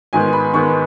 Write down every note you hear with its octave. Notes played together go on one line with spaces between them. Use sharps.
G#2 D#3 G#3 B3 G#5
B5
G#2 D#3 G#3 B3 C#6